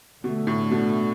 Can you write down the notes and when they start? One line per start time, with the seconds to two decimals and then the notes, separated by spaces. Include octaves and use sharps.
0.23 B2 D3 A3
0.47 A2
0.71 B2